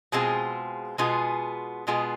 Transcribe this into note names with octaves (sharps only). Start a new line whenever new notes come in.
B2 G#3 C4 F4 G#4
B2 G#3 B3 F4 G#4
B2 G#3 B3 F4 G#4